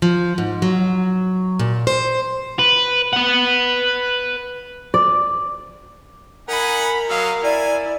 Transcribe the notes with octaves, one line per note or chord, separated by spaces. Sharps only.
F3
G#2
F#3
A#2
C5
B4
B4 F#5
D5
D#4 A#4 F#5 G#5 B5
F#3 D#5 F5 E6
E4 D5 G#5